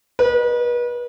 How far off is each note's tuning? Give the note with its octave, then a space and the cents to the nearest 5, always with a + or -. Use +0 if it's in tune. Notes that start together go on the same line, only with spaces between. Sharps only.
B4 -35 D#5 -35